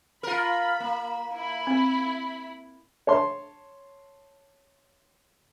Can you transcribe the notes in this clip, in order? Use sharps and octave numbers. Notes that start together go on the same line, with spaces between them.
F4 A#4 B5
A#3
E4 B5
C4
C#5 A5 C6